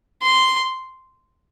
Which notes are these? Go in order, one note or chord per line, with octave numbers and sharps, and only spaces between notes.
C6